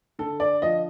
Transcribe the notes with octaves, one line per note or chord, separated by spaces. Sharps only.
D3 A4
D5
F3 D#5